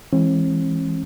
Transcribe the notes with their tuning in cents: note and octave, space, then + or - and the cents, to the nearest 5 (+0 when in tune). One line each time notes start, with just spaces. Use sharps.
E3 +0 G#3 +0 C4 +45